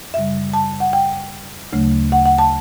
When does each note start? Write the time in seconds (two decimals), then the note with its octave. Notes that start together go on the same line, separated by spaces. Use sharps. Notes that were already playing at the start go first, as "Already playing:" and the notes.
0.14 F#2 C#3 G3 E5
0.53 A5
0.80 F#5
0.93 G5
1.73 D2 C#3 F#3 A3
2.12 F#5
2.26 F#5
2.38 A5